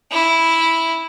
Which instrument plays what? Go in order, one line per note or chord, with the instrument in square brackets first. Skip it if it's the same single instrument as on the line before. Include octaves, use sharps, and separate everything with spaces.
[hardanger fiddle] E4